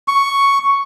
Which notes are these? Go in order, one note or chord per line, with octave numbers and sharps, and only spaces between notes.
C#6